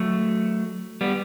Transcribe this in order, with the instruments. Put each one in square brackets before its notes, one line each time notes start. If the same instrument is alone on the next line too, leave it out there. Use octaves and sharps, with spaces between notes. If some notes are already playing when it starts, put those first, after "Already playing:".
Already playing: [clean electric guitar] F#3 A3
G3 B3